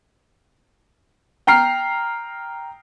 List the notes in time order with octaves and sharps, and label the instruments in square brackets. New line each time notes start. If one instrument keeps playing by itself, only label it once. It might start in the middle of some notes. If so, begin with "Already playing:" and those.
[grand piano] G5 A#5 F6 C7